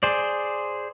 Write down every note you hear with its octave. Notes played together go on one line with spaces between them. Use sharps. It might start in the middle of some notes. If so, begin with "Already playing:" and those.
G#4 C5 D5